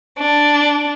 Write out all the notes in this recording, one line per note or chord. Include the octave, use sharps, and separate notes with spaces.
D4